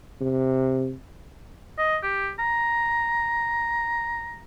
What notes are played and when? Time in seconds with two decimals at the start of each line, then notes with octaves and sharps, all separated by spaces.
0.21 C3
1.78 D#5
2.03 G4
2.39 A#5